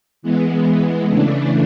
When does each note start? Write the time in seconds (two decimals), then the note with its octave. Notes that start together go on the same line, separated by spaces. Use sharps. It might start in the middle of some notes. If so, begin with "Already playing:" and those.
0.22 E3 G#3 B3
1.08 C#3 E3 A3 D4